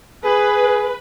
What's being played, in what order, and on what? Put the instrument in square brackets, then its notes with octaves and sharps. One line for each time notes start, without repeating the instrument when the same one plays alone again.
[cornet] G#4 [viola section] B4